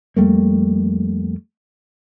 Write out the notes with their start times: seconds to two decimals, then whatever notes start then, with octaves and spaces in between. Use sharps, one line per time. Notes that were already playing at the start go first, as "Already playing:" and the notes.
0.16 F2 G3 A3 A#3